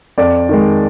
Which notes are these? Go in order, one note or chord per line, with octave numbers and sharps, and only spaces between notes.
F2 D5
D#3 G#3